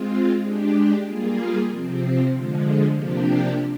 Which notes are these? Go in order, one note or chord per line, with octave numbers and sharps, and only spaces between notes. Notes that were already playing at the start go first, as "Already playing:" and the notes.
Already playing: G#3 C4 F4
G#3 D4 G4
G3 A#3 F4 G#4
C3 F3 C4
D3 F3 G#3
C3 F3 A#3 D4 G4